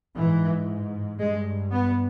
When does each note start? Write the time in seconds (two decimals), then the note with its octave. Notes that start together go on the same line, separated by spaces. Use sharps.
0.17 G#2 E3
1.20 G2 G#3
1.71 B3